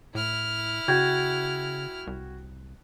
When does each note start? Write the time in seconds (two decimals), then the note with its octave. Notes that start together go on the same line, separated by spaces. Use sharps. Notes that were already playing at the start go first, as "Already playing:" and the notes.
0.15 A2 E4 F6
0.88 C#3 F#4 G5 G6 G#6
2.07 C2